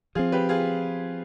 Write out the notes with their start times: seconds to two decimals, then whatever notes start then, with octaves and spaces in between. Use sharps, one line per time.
0.15 F3 C4 F4 G#4
0.32 G4 B4
0.49 F4 G#4